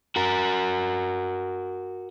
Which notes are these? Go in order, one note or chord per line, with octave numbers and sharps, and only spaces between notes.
F#4 A#4